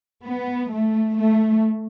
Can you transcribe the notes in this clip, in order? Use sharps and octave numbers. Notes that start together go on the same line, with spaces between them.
B3
A3
A3